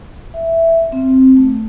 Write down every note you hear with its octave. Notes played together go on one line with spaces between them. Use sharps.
E5
C4
A3